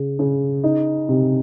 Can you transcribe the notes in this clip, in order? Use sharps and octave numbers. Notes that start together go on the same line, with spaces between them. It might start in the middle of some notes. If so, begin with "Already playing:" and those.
Already playing: C#3
C#3
D#4
C3